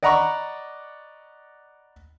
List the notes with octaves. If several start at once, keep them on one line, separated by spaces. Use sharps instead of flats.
D5 D#5 F#5 A#5 B5 C#6